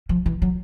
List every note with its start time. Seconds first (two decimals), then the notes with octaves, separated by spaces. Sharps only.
0.09 F3
0.26 E3
0.42 F#3